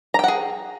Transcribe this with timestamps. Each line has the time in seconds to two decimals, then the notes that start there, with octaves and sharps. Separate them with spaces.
0.14 A#5
0.19 G5
0.24 F#5
0.28 G#4